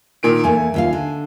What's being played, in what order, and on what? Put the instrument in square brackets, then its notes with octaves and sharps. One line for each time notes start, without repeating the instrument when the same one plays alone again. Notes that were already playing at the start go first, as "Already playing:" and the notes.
[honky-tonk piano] A#2 D#3 D7
[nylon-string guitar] E2 A3 A#3 [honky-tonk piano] G#5
[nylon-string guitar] D#2 F4 F5
D3